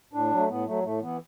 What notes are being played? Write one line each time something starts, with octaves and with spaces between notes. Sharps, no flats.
A2 D4
F#3
A3
A2 B3
F#3 A3
A2 A3
E3 B3